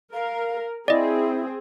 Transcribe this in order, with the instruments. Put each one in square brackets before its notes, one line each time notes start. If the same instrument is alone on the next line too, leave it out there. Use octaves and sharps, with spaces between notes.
[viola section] A#4 [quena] F5
[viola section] C4 G#4 [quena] E4 [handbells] D5 D#5